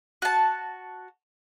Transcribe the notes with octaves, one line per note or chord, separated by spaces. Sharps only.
F#4 A5